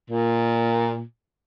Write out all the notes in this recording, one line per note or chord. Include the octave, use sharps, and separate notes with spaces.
A#2